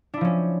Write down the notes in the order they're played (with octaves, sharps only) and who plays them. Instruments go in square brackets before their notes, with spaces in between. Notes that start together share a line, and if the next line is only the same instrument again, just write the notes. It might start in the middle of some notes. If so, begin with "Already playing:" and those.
[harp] D4
E4
F3
C#4